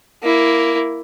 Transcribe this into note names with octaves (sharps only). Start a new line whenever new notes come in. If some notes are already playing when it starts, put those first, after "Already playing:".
A#3 E4